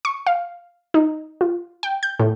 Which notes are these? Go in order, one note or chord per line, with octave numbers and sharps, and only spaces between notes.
C#6
F5
D#4
F4
G5
G6
A2